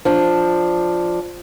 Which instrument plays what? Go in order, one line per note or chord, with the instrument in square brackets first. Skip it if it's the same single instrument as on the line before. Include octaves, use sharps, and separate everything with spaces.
[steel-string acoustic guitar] F3 D4